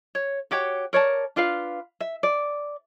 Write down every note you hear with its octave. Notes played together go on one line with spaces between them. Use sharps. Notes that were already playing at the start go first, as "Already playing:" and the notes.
C#5
F#4 G4 C#5 G5
A#4 C#5 D5 A5
D4 F4 B4 F5
E5
D5